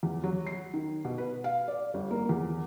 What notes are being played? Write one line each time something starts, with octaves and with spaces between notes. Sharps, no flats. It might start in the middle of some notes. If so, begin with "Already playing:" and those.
E2
F#3
C7
D#3
B2
B4
F5
D5
G1
A#3
E2